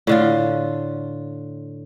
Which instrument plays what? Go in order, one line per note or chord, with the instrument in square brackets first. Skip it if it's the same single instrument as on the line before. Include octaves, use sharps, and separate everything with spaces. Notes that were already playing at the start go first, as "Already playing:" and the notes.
[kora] A2 D3 F4